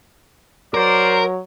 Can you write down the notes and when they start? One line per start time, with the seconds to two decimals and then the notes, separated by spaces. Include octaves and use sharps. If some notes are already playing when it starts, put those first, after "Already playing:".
0.74 F#3 A#4 C5 D5